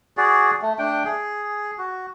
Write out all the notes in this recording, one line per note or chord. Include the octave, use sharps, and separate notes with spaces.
F#4 G#4 D5
A3
A3 D4 G5
G#4
F#4